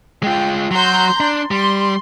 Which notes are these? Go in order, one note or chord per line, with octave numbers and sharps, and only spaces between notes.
G#3 F4 G5
F#3 F#4 A#5 C6 G6
D4 C6
G3 C6